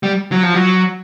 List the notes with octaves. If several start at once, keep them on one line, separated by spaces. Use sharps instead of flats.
G3
F#3
F3
F#3